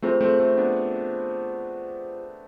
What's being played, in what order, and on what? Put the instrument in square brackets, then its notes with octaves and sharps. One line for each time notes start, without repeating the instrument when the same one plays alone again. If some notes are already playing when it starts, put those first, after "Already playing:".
[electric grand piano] A3 C4 [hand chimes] F4 G#4 C5
[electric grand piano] A3 C4
A3 C4
B3 D4